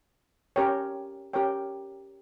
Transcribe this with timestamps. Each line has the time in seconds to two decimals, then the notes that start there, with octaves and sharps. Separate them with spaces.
0.56 C#4 G4 A#4 C#5 G5
1.33 C#4 G4 A#4 C#5 G5